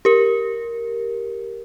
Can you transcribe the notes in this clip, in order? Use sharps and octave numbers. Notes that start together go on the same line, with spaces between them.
G4 A#4